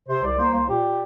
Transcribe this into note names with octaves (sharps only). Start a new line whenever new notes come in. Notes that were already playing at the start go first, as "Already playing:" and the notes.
C3 C5
C2 D5
A#3 C5
C2 C5
A#2 G4